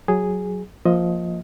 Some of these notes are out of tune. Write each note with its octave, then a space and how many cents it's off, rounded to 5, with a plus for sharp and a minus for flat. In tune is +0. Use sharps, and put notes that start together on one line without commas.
F#3 +0 G#4 -5
F3 +0 A#3 +0 D#5 +15